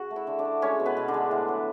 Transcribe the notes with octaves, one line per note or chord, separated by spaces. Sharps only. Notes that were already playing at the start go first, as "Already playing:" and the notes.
Already playing: C#3 F#4 F#5
A3
E4 E5
D3
D4 D5
A3
G#3 C#4 C#5
B2
B3 B4
B2
D3 D4
G#3
A2
F#3